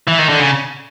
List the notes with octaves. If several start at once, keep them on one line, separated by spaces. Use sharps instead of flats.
E3
D#3
D3
C#3